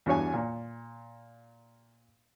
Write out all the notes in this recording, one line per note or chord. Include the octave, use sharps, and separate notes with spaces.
E2 G2 F#4 C#5 G#5
A#2